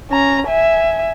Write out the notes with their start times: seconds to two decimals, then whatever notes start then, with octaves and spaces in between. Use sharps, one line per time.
0.10 C#4 A#5
0.48 E5 G#5